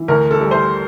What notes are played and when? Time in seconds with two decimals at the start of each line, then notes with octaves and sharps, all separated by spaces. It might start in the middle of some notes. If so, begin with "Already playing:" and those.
Already playing: E3
0.08 D2 A#4
0.31 A4
0.41 G3
0.51 C5